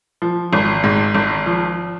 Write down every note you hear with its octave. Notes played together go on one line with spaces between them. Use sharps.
F3
G#1
G#2
G#1
F3